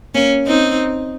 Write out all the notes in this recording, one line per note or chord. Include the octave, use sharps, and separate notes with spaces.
A#3 C#4
C4 D#4